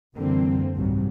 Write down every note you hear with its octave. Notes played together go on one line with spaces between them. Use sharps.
F#2 D3 E3 G3 A#3 C4
C2 G#2 F#3 G3